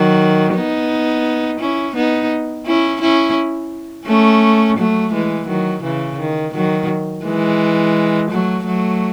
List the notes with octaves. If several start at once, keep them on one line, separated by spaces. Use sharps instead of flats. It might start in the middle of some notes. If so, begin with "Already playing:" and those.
Already playing: D#3 F#3
B3 D#4
C#4 E4
B3 D#4
C#4 E4
C#4 E4
A3 C#4
F#3 A3
E3 G#3
D#3 F#3
C#3 E3
D#3
D#3 F#3
E3 G#3
F#3 A3
F#3 A3